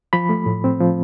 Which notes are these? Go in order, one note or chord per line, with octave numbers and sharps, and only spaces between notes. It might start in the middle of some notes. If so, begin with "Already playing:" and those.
F3 B5
A3
A2
C4
F3